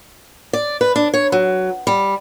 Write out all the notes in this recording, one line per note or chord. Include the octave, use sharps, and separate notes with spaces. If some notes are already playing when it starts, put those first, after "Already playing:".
D5
B4
D4
C#5
F#3
G3